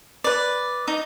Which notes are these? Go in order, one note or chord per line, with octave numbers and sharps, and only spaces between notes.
B4 D5
D#4